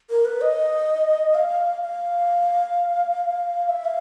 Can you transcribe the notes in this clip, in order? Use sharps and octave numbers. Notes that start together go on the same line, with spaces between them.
A#4
B4
D#5
F5
F5
E5
F5